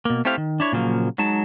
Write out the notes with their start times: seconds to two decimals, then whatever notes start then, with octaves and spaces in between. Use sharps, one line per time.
0.05 B2 A#3
0.25 A3 C4 E4 G4 C5 F5
0.38 D#3
0.60 D4 E4 C#5
0.73 A#2 C#3 F3 F#3 A#3
1.18 F#3 G#3 D#4 A5